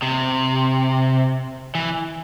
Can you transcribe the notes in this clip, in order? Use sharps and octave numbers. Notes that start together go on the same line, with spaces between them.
C3
E3